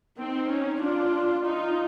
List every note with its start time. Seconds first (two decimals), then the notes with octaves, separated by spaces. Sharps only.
0.19 C4 D#4
0.51 C#4
0.82 D4 F4
1.46 D#4 F4